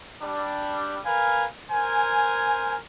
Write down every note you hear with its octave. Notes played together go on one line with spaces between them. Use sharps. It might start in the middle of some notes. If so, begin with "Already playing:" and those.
G3 D4
A#4 B4 F5 G#5
A#4 C5 G#5